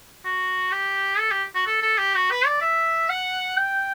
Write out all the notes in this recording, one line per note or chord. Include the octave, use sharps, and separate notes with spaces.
F#4
G4
A4
G4
F#4
A4
A4
G4
F#4
B4
D5
E5
F#5
G5